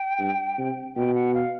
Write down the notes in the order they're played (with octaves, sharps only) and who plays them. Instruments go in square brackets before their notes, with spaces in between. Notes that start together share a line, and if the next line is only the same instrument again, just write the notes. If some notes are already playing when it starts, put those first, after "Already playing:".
Already playing: [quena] G5
[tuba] G2
C3
[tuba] B2 [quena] G5
[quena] F#5
F5